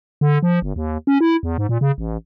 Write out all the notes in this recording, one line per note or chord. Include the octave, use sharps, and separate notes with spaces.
D3
F3
G1
D#2
C#4
E4
E2
G#2
A#2
C#3
A1